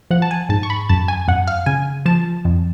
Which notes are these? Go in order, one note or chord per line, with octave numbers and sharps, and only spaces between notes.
F3 F#5
A5
G#5
G#2 A5
C#6
B5
F#2 A5
G#5
F#2 F#5
F5
C#3 G#5
F3 A5
F2